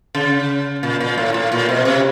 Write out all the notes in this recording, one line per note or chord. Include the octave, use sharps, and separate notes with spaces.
C#3
A#2
A#2
A2
A2
A#2
B2
C3